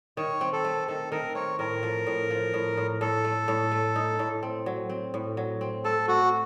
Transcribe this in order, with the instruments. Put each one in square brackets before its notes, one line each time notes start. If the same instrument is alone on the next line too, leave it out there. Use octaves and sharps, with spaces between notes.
[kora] D#3 [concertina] C#5
[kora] C4
[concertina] A4
[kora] A3
[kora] D#3 [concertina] A4
[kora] D#3 [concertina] A#4
[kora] C4 [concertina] C#5
[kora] A2 [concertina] A#4
[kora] F3
A2
F3
A2
A2
[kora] A2 [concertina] A4
[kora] A3
A2
A3
D#4
A2
C4
F#3
C4
A2
F#3
C4
[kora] A3 [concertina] A4
[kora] A3 [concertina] F#4